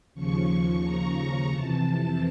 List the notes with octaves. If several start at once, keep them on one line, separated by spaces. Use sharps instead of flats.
D#2 C#3 F3 C#6
A#5
F2 C3 E3 A5